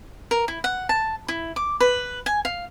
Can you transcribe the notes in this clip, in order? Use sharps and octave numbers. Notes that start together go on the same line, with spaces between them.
A#4
E4
F#5
A5
E4
D6
B4
G#5
F5